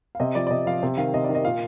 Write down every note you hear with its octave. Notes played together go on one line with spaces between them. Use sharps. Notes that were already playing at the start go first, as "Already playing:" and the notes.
F5
C3 D#5
F3 D5
D5
C3 D#5
F3 F5
C3
D#3 F5
C3 D#5
D5
D#3
D#5
A#2 F5